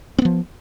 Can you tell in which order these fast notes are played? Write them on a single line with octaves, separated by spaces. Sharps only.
C4 B3 F3